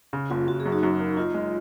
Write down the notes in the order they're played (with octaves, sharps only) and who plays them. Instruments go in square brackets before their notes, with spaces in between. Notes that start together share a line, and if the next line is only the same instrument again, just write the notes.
[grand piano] C#3
[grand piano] F#1 [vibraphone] F4
[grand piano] F#1 [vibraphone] F#4
[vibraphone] G#4
[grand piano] F#2
[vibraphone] D#4 F#4
[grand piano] F#2
A#3
[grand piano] D#4 [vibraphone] F4
[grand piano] G#3